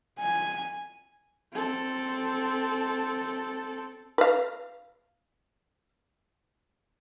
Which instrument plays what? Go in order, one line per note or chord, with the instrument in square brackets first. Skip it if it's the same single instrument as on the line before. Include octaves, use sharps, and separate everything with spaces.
[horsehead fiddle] G#5
C4 A4
[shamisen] B4 F5